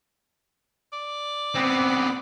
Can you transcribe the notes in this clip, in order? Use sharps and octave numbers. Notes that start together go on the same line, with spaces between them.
D5
B3 C4